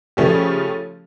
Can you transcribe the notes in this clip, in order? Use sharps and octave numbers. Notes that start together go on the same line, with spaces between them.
C#3 F3 A3 C#4 G4